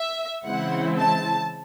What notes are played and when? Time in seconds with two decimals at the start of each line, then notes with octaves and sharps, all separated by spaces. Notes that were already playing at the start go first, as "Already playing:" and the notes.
Already playing: E5
0.45 C#3 E3 G#3 C4 E4 F#5
0.99 A5